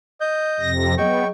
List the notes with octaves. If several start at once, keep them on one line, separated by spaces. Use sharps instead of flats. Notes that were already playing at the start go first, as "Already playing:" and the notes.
D#5 G6
F2 C3 A#6
F#3 B3 G#4 D#5 G5 C#6